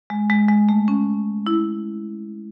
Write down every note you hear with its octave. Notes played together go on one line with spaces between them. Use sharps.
G#3
G#3
G#3
A3
C#4
E4